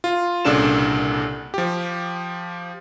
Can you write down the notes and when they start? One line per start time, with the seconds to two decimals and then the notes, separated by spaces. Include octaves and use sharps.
0.04 F4
0.45 C2 A#2 C#3 D4 A4 E7
1.54 F3 G4